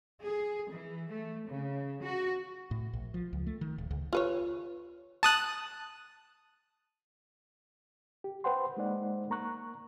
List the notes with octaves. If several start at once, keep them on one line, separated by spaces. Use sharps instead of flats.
G#4
E3
A3
C#3
F#4
A2
A#1
F3
C#2
A3
D#3
D1
C#2
F4 B4 C#5
A5 D#6 F#6
G4
B4 C5 F#5 G5 C6
G#3 A#3 D#4 C5 D5 F#5
A#3 A#5 C#6 F#6